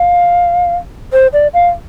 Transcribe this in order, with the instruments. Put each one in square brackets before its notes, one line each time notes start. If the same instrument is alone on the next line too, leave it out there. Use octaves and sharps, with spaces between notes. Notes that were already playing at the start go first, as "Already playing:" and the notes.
Already playing: [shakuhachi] F5
C5
D5
F5